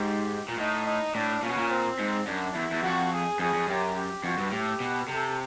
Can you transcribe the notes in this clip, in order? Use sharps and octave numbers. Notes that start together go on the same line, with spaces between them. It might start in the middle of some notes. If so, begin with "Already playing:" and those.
Already playing: G#2 G4
A#2
A2 D#4
D#4
A2 D4
A#2 C#4
B2
A#2
C4
G#2
F#2 D4
E2 E4
E2
F2 F#4
G#4
F2 G#4
F2
F#2 G4
G4
F2 F#4
G2
A2 G4
B2
C3 A4